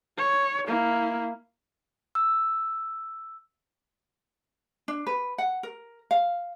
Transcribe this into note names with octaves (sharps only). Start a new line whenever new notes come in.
C#5
A#3 E4
E6
D4
B4
F#5
A#4
F5